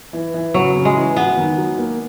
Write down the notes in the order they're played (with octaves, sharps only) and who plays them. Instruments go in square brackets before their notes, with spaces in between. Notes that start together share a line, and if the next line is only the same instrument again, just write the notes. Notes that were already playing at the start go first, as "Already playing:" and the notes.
[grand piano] E3
E3
[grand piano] C#3 [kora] F#3
[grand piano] C#3
[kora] G#3
[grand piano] E3
[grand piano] F#3 [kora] B3
[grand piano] D#3
F#3
A#3